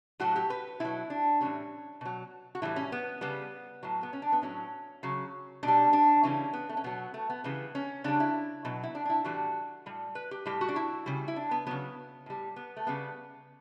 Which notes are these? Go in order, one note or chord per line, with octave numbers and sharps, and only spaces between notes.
A2 F#3 F#4
G4
B4
B2 F#3 E4
D4
A2 E3 G3 C#4
B2 F#3
F#4
A2 E3 G3 E4
C#4
B3
C#3 G3 B3
A2 F#3
B3
C#4
D4
B3
A2 F#3 C#4
C#3 F#3
B2 D4
G3
D4
C#3 E3 G3 C#4
B3
A3
C#4
B2 F#3 B3
A3
B3
C#3 E3 G3 B3
C#4
C#3 G3 D4
E4
B2 F#3
E4
D4
D4
E4
A2 E3 G3 F#4
A2 G3
B4
G4
A2 G3 G4
F#4
D4
E4
C#3 G3
E4
D4
B3
C#3 F#3 B3
A2 G3
B3
A3
C#3 G3 B3